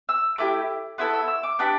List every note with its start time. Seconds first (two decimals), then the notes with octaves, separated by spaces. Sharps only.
0.09 E6
0.38 A3 E4 G4 D6
0.98 B3 E4 A4 B5
1.13 E6
1.28 E6
1.43 D6
1.59 B3 D4 G4